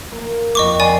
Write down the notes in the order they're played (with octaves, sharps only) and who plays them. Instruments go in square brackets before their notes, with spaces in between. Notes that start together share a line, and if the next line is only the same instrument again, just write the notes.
[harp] A#3
[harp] F2 A#3 [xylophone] D#5 C#6 D6
[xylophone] D5 G#5 [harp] B5 D6 C7